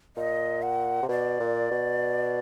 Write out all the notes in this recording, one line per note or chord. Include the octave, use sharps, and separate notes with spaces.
A#2 D#5
F#5
C3
B2 D5
A#2
B2